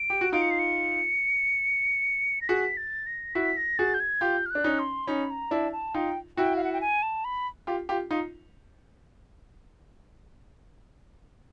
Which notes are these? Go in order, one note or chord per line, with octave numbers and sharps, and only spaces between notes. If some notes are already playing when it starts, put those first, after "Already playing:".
Already playing: D7
G4
F#4
D#4 F4 D7
C#7
C7
C#7
A#6
F#4 G#4 B6
A6
A#6
E4 F#4 B6
A#6
F#4 G#4 A6
G6
G#6
F4 G4 G6
F6
D4 F#6
C#4 D#4
C6
C#4 D#4 B5
A#5
D4 E4 A5
A5
D#4 F4 G5
E4 F#4 G5
F5
F#5
G5
G#5
A5
B5
F4 G4
F4 G4
D#4 F4